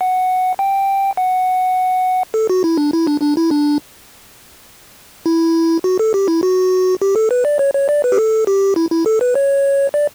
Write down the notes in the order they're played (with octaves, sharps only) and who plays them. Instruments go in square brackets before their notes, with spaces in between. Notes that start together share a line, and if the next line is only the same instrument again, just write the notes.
[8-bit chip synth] F#5
G5
F#5
A4
F#4
E4
D4
E4
D4
D4
E4
D4
E4
F#4
A4
G4
E4
F#4
G4
A4
B4
D5
C#5
C#5
D5
B4
G4
A4
G4
E4
E4
A4
B4
C#5
D5